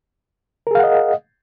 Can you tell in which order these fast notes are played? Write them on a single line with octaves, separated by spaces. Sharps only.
A#4 G#4 F5 F#5 D#5